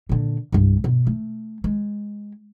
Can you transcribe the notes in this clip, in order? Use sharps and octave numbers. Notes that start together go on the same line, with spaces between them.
A#2 D3
C2 G2
B2
A3
G#3